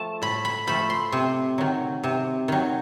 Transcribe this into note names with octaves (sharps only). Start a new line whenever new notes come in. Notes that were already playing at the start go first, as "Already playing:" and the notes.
Already playing: F3 A3 A5
A2 B5
B5
F3 A3 B5
C6
C3
D#3 F#3
C3
D#3 F#3